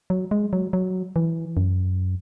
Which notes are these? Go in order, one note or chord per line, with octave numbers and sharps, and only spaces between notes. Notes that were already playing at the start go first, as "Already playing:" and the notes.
F#3
G#3
F#3
F#3
E3
F#2